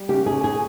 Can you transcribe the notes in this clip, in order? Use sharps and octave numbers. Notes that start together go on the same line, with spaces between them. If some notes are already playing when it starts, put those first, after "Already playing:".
Already playing: G3
C#3 G4
G#4
C#3
G#4